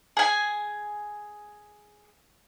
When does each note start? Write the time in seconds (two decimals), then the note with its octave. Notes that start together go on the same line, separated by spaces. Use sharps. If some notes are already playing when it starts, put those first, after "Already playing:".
0.17 G#4 G#5